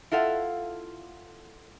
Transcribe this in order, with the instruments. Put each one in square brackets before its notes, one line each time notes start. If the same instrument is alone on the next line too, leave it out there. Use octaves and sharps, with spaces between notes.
[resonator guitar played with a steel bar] E4 F4 A4 F5 F#5